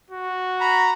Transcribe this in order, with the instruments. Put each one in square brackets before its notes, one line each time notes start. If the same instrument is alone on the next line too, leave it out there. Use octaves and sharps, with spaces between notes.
[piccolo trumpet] F#4
[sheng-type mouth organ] A#5 B5